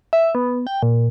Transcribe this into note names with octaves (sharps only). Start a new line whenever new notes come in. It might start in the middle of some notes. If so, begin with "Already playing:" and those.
E5
B3
G5
A#2